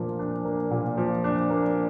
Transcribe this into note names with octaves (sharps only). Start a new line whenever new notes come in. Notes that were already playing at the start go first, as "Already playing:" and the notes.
Already playing: A#2 F3 A#3 D4
D4
A#3
A#2
F3
D4
A#3